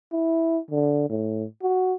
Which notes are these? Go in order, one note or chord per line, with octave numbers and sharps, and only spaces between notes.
E4
D3
A2
F#4